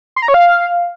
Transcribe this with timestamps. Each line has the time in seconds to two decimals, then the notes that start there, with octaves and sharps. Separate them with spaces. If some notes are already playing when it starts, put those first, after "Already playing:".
0.16 C6
0.22 A#5
0.28 C#5
0.34 F5